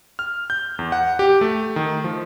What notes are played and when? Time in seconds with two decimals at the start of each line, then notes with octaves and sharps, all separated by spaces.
0.19 F6
0.50 G6
0.79 E2
0.92 F#5
1.19 G4
1.41 A3
1.76 D#3
2.04 F3